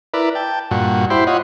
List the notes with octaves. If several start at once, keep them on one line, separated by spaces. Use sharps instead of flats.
E4 A#4 B4 D5
G5 A5
G2 A#2 F#4
E4 G4 C5 B5 C6
F4 C#5 D#5 F#5 B5